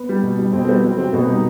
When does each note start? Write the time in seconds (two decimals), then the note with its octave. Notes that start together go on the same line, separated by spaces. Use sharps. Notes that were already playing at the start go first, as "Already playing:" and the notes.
Already playing: B3
0.09 G3
0.23 B2
0.39 G3
0.53 B2 C4
0.64 C4
0.68 G3 B3
0.83 F#3 C4
0.98 C3 C4
1.13 B2 B3
1.27 D#3 G3 D#4